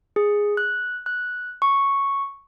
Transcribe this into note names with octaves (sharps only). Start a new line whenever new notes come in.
G#4
F#6
F#6
C#6